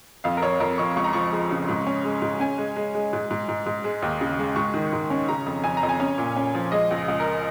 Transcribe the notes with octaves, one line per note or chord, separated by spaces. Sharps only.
F2 F5
A#4
F2 C#5
F2 A#4
F2 C#6
C#2 C#6
A#5
F3 C#6
G#3
C#3
G#2
C#4
G#3
G#2
C#4 G#5
G#3
G#3
G#3
G#2
G#2
G#2
G#2
G#3
D#2
C#3
G#3
G#2 C#6
D#3
G#2
C#4
C#3 A#5
F2
F2 G#5
A#5
F2
G#5
C#4
A#2
C#4
F3
G#3 D#5
C#2
C#2
A#4